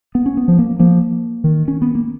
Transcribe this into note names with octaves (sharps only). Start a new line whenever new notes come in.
B3
C#4
B3
F3
A#3
F3 A#3
D#3
C#4
B3
A#3